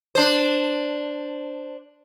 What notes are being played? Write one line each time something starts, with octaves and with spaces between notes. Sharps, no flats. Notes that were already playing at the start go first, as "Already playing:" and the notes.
D4 C5